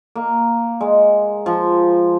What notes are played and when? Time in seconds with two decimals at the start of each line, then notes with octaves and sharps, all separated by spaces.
0.15 A#3
0.81 G#3
1.46 F3